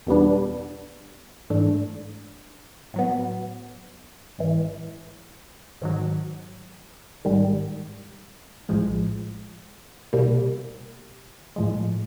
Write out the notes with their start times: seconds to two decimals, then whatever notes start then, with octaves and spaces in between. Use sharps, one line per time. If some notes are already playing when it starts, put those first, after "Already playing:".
0.07 E2 B2 G3 B3 D4
1.50 G#2 E3 A3 D4
2.94 A2 F#3 B3
4.38 A1 G#2 E3
5.81 G#2 D#3 F#3
7.25 A1 G#2 D#3 G3
8.69 A#1 A2 F3 G#3
10.13 C2 B2 G3 A#3
11.56 A2 F3 G#3